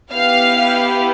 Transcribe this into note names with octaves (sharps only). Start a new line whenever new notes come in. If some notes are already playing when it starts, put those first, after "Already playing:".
B3 E4 G4 F5